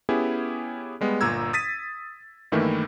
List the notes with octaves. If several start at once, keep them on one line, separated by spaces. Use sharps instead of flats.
B3 C#4 E4 G4 G#4
G3 G#3 B3
G1 A#2 A#5 E6 G#6
D#6 A6 B6 D#7
G2 D#3 E3 A3 A#3 E4